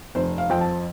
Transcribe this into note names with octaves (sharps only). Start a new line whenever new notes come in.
F1 C5
F5
F2 F3 C4 G5
A5